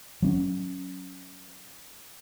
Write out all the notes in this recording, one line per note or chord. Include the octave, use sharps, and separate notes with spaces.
F#3 C4 C#4